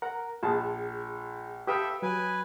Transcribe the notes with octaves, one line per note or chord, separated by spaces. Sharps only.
A#4 F#5 A#5
A#1 F4 G#4 A5
G4 A4 B4 E5 F5 G5 D#6
F#3 B4 G#5